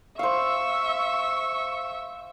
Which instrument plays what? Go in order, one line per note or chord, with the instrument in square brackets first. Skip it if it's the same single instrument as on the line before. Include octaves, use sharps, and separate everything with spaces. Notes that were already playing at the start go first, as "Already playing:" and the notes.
[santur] C5 F5 [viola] E5 [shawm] C#6